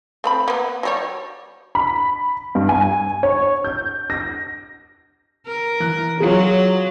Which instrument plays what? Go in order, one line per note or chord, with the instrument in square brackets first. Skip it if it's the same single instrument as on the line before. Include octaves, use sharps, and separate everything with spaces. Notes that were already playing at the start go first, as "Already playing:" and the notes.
[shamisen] A3 C4 B5
A#3 B3
F#3 G3 C#5
[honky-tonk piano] B5
G2
G#5
C#5
G6
A#6
[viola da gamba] A#4
[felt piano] E3 F#6
[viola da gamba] F#3 [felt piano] F4 G#4